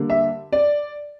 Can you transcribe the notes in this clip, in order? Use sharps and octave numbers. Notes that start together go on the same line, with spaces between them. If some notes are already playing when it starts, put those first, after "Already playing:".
Already playing: D3 G3 A#3
E5
D5